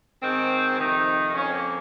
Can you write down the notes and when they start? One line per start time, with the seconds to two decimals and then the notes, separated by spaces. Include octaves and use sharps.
0.23 G#2 D#3 C4
0.79 F2 C3 D#3 D#4
1.35 F2 C#3 C#4
1.54 A#3